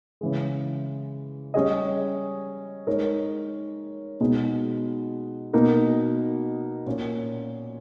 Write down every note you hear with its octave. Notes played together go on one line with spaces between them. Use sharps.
C#3 E3 G#3
G3 C#4 G#4 D#5
G#3 D#4 A#4 C#5
B2 G#3 D#4
B2 A#3 D#4 A#4
A#2 A#3 C#4